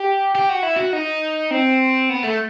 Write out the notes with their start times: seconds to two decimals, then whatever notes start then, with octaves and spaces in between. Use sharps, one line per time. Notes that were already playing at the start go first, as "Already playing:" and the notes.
Already playing: G4
0.35 G4
0.49 F#4
0.63 E4
0.76 F#4
0.93 D#4
1.51 C4
2.09 B3
2.24 A3